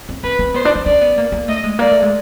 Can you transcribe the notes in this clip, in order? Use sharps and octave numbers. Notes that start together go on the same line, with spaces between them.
C4
C4 B4
C4
B3 C5
D4
C#4
C#4 D5
B3
A#3
A#3
A3 D#5
G#3
A#3 D5
A3
G#3